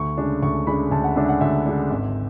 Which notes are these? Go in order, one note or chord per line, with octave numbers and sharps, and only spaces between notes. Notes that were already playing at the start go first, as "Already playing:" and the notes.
Already playing: D2 C#6
C#3 G#3 D4
D2 C#6
C#3 G#3 D4 B5
D2 A5
F#5
C#3 G#3 D4 E5
F#5
D2 E5
C#3 G#3 D4
G#1